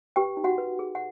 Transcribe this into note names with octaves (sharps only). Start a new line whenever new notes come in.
G4 B4 G5
D#4
F#4 F#5
B4
G#4
F#5